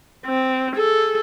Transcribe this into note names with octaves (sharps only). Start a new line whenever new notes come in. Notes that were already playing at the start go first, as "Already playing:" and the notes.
C4
G#4 A4